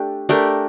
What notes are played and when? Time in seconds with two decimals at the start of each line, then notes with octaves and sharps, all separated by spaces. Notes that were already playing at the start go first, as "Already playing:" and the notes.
Already playing: A3 D4 G4
0.29 A3 D4 G4 A#4